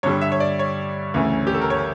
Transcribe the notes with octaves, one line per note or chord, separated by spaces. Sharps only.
G2 D3 G3 C#5
E5
C#5
D5
C#5
D2 C#3 E3 A3
G4
A4
A#4
C#5